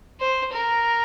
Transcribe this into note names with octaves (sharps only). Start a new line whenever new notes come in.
C5
A#4